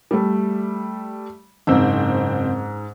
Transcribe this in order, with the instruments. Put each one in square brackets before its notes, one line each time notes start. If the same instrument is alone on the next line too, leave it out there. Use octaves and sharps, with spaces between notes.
[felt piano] G3 A3
[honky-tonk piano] F#1 C4 [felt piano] G#2 E6